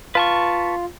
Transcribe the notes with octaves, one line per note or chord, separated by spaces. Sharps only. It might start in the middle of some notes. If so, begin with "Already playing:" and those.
F4 B4 A5 C#6